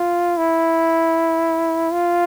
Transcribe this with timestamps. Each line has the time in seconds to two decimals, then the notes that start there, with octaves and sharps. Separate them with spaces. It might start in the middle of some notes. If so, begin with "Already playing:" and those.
Already playing: F4
0.37 E4
1.92 F4